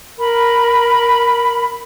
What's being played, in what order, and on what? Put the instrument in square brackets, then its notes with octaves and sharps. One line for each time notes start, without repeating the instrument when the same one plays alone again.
[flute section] A#4 B5